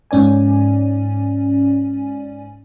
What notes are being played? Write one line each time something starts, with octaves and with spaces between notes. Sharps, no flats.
G#2 C#4 D5 G#5